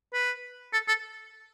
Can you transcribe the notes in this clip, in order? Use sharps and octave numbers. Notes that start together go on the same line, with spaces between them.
B4
A4
A4